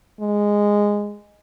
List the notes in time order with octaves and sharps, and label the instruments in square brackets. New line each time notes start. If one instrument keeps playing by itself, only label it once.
[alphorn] G#3